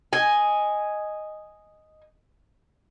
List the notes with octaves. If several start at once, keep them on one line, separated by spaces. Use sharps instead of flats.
D#5 G#5